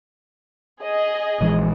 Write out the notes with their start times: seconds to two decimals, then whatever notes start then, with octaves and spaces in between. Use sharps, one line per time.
0.81 G#4 D#5
1.41 A#1 E3 G#3